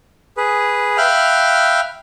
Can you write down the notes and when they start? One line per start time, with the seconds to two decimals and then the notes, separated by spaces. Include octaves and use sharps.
0.37 G#4 B4
0.98 E5 F5 G5 B5 F6 F#6